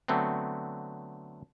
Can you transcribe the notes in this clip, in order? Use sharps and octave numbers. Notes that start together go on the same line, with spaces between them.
D3 F#3 A3 B3 C4